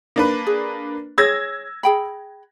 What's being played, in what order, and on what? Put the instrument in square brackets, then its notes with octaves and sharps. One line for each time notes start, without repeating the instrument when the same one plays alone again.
[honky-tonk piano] A#3 D4 B4
[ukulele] G#4
[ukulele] G#4 C#5 [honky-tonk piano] E6 G#6 A#6
[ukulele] G#4 G5 B5